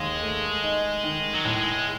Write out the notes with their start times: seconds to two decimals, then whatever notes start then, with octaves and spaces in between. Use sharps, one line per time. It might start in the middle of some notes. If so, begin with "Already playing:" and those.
Already playing: D#2 G#3
0.22 A3
0.63 D#4
1.04 D#3
1.34 F#3
1.45 A2 G#3